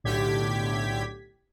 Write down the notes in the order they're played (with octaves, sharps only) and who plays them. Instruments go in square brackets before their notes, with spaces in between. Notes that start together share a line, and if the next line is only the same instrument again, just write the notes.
[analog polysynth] B1 A2 D3 G4 G#6 B6